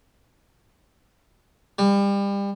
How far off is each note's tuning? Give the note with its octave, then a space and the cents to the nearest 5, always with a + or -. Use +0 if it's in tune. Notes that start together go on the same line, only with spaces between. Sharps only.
G3 +30